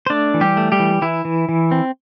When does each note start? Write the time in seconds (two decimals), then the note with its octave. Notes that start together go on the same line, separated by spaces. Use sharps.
0.07 C5
0.10 A3 D4 D5
0.34 E3
0.41 G3 G4
0.57 A3
0.72 G3 G4
0.80 E3
1.02 E3 E4
1.25 E3
1.49 E3
1.71 C4